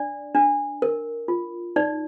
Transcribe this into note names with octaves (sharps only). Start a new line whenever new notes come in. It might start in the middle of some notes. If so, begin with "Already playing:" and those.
Already playing: D4 D5
D4
A#4
F4
D#4 D5